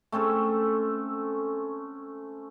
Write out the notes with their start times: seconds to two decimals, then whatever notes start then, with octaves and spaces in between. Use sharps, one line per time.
0.12 A3 C4 C#4 A4